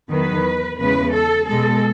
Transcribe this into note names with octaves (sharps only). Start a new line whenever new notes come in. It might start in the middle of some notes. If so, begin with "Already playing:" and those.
E2 D#3 F#3 B4
E2 C#3 G#3 B4
A4
B2 G#3 A4